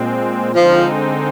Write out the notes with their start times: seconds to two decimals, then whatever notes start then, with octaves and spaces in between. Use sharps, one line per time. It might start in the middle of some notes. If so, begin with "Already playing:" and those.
Already playing: A#2 G#3 C4
0.54 D3 F3 G#3 C4 D#4